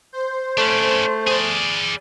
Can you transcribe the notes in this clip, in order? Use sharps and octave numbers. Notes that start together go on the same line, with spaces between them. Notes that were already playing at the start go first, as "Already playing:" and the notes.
C5
A3 C#4 D4
G#4 D5